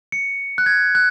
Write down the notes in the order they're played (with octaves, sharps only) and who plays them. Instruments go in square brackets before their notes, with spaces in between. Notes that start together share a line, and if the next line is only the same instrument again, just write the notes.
[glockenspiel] C#7
F#6
G#6
F#6